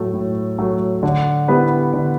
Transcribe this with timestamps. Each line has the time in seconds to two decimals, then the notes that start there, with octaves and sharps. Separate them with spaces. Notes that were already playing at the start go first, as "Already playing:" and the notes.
Already playing: A2 F#3 A3
0.14 A2
0.58 F#3 A3
1.03 D3
1.48 G3 B3 E4 B4
1.93 D3